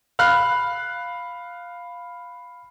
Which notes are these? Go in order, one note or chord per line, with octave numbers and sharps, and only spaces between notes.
F5 B5 F6 F#6